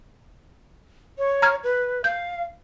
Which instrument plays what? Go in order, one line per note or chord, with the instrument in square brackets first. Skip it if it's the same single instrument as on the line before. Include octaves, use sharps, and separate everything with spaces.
[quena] C#5
[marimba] A#5 F6 G#6
[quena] B4
[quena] F5 [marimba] G6